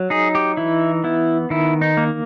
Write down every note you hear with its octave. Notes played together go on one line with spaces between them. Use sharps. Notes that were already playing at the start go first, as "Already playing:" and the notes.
Already playing: F#3
D#4 G#4
G4
E3 E4
B3 E4
D#3 E4
D#4
A#3